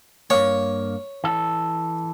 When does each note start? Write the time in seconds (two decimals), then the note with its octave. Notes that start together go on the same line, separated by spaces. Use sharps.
0.30 G2 A#3 C#5
1.24 E3 A4